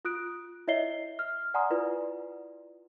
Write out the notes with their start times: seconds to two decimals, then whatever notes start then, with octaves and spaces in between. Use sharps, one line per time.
0.05 F4 D#6 F#6 D7
0.68 E4 C#5 D#5 E5 C7 G7
1.19 F6
1.54 D5 F#5 G#5 A#5 C6 D#6
1.70 E4 F4 B4 D5